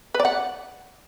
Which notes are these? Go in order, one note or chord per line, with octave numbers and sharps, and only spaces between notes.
B4
D5
F#5